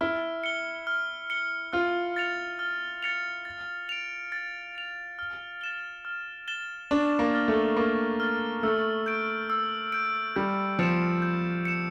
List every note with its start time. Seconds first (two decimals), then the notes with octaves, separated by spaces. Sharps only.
0.01 E4 F6
0.44 C#7 G7
0.87 F6
1.30 C#7 G7
1.73 F4 F6
2.16 A6 C#7 F7
2.59 F6
3.03 A6 C#7 F7
3.45 A6
3.89 D7 F7
4.32 A6
4.75 D7 F7
5.19 F6
5.61 A6 E7 G7
6.05 F6
6.48 A6 E7 G7
6.91 D4 C#6
7.19 A#3
7.34 F6 A6
7.48 A3
7.77 A#3 C#6
8.20 F6 A6
8.63 A3 E6
9.06 G6 D7
9.50 E6
9.92 G6 D7
10.36 G3 G6
10.79 F3 C#7 E7
11.22 G6
11.65 C#7 E7